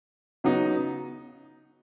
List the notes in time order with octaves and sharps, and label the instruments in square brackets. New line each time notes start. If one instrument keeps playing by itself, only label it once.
[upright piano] C#3 F#3 B3 D#4